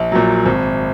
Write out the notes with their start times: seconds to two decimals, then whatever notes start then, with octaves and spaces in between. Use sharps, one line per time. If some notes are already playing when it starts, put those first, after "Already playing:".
Already playing: A#1
0.12 A#2 F#3
0.46 G#1